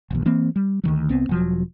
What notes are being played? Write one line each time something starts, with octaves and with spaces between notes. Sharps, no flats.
E1 A#1 D#2
E3 A#3 C4
G3
D2 D#3 F#3
C2 B3 C4
E1 F3 F#3